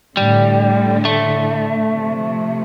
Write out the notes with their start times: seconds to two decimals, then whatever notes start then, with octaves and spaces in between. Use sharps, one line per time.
0.17 A2 D3 G3
1.05 A3
1.93 C3 F3